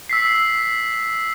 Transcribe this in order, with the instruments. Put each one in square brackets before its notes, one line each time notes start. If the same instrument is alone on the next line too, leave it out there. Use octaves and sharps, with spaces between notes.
[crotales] E6 B6 C7